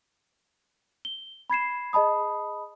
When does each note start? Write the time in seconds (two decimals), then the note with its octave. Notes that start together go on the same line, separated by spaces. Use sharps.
1.05 G7
1.50 B5 G#6 C7 E7
1.93 G#4 D#5 A5 B5 D#6